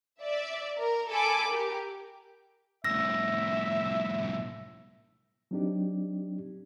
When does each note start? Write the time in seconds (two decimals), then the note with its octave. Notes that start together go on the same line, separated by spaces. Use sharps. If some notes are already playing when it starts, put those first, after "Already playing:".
0.21 D5 E5
0.78 A#4
1.11 A4 G#5 B5 D6
1.51 G4 A#4
2.84 C2 A2 E5 E6 A#6
5.51 F#3 C4 D4 D#4 G4